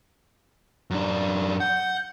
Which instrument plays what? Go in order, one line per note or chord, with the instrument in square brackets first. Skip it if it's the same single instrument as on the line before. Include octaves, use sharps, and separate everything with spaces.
[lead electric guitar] F#2 D4
[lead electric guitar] F#5 [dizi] G6